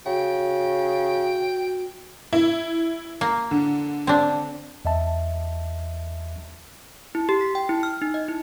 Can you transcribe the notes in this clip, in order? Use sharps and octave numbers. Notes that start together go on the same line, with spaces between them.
C#3 F#4 G5
E4
A#3
D3
C4 D4
E2 D#5 E5 A5
E4
G4
B6
G5
E4
F6
D#4
D#5
E4